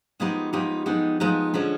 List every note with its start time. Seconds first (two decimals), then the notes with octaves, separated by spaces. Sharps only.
0.20 F3 G#3 B3 D#4 G4
0.53 F3 G#3 B3 D#4 G4
0.86 F3 G#3 B3 D#4 G4
1.20 F3 G#3 B3 D#4 G4
1.54 D3 F3 G#3 C#4